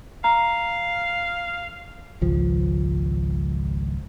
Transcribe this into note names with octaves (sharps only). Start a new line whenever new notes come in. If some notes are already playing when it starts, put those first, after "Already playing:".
F5 A#5
G#1 C#2 F3